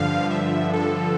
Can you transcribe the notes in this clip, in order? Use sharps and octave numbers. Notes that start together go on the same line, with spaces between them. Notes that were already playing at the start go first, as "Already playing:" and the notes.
Already playing: G2 D3 F3 F5
E5
A4